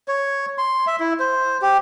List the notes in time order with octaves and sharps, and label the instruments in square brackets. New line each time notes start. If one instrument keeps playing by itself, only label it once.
[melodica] C#5
C6
E5
E4
C5
G4